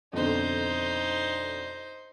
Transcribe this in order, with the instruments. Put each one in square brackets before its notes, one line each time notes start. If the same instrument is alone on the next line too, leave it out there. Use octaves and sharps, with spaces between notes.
[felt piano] F2 B2 D3 [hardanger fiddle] D#4 C5